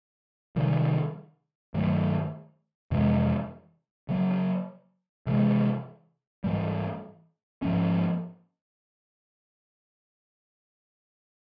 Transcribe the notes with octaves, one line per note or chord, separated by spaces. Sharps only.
C3 D#3 G3
G2 D#3 F#3 A3
F2 C3 E3 G#3
C#3 F#3 A#3
C3 E3 G#3
G#2 E3 G3
G#2 F3 A#3 C#4